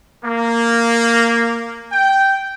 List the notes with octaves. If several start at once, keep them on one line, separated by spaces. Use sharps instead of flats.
A#3
G5